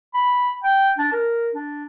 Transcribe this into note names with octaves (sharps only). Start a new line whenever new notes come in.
B5
G5
D4
A#4
D4